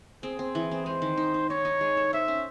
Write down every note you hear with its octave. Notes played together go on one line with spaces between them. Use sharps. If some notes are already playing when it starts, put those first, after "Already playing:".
C4 G#4
C4
E3
C4
G#3 C5
D#3
D#4
D#4
D#4 C#5
D#4
G#3
A4
C5 E5
C#4